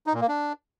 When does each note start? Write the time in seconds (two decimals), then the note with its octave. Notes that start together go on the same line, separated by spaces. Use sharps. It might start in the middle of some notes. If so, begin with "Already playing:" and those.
0.07 D#4
0.14 A#2
0.21 A#3
0.28 D4